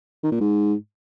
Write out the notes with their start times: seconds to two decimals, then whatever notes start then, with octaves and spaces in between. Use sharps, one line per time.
0.23 D#3
0.32 A#2
0.40 G#2